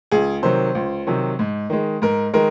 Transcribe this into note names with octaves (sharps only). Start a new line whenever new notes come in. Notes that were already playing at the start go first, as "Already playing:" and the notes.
C#2 G#4
C3 D#3 F#3 C5
C#2
C3 D#3 F#3
G#2
D#3 G#3
G#2 A#4
D#3 G#3 A#4